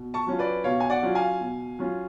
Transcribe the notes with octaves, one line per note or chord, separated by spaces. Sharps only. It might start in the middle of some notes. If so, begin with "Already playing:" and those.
Already playing: B2
A5 C#6
F#3 C#4 F4
B4 D5
B2 C#5 F5
G#5
D5 F#5
F#3 C#4 F4
F5 G#5
B2
F#3 C#4 F4